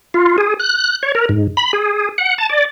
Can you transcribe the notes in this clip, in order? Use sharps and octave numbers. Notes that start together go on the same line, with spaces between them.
F4
G#4
F#6
C#5
A#4
G#2
B5
G#4
F#5
A5
D5